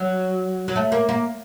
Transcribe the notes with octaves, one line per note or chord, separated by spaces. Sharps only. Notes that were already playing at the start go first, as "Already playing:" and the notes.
Already playing: F#3
F#3
A3
A#3
A#3